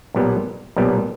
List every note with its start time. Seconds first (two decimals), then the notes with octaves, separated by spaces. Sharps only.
0.14 B1 A#2 G3 B3
0.76 B1 A#2 G3 B3